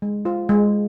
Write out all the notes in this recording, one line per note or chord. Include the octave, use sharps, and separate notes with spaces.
G#3
F4 C5
G#3